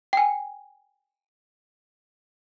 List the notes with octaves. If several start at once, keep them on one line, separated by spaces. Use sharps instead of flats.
G5 G#5